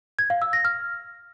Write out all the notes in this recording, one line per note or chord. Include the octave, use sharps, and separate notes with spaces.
G#6
F5
E6
A#6
F6